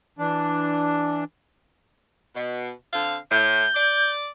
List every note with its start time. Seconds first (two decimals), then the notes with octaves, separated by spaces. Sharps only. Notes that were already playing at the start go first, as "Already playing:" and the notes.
0.19 E3 D4
2.35 B2
2.93 D3 C4 F5
3.31 A2 G6
3.75 D5